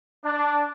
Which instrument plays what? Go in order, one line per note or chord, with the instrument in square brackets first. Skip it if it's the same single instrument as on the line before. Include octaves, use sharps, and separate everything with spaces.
[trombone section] D4